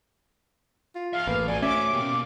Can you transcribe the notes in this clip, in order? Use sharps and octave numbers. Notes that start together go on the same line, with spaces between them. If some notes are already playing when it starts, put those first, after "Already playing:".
F4
G#4 E5 F5
A1 A#3 B4
A3 F#4 D5 G#5
C#4 E5 D6
B2 A#3 G4